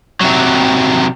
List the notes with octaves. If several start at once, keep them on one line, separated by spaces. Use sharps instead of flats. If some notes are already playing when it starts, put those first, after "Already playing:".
C3 F#3